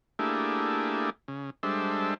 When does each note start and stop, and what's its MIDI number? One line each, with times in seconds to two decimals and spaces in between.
0.19 1.10 57
0.19 1.10 58
0.19 1.10 62
0.19 1.10 64
0.19 1.10 67
0.19 1.10 68
1.28 1.50 49
1.63 2.14 55
1.63 2.14 56
1.63 2.14 62
1.63 2.14 69
1.63 2.14 72
1.63 2.14 76